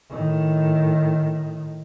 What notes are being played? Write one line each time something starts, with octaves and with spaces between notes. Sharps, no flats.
A2 D#3